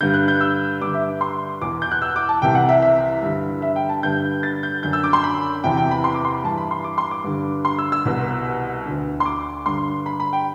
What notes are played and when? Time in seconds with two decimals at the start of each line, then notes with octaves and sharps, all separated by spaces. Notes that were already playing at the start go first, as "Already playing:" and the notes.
0.01 G2 D3 G6
0.14 F#6
0.28 G6
0.41 E6
0.81 G2 D3 D6
0.94 E5
1.21 C6
1.62 E2 B2 D6
1.82 G6
1.91 F#6
2.02 E6
2.16 D6
2.29 A5
2.42 C2 C3 E3 G5
2.55 F#5
2.69 E5
2.82 E5
3.23 G2 D3
3.62 E5
3.76 G5
3.89 A5
4.03 G2 D3 G6
4.43 A6
4.63 G6
4.83 F#2 D3 G6
4.93 E6
5.04 D6
5.13 C6
5.23 B5
5.64 E2 C3 E3 G5
5.77 G5
5.91 B5
6.04 C6
6.15 D6
6.25 C6
6.34 B5
6.44 G2 E3 A5
6.57 B5
6.71 C6
6.84 D6
6.98 C6
7.11 D6
7.24 G2 D3
7.65 C6
7.78 E6
7.92 E6
8.05 C2 B2
8.86 D2 D3
9.20 C6
9.25 D6
9.66 G2 D3 C6
10.06 B5
10.20 B5
10.33 G5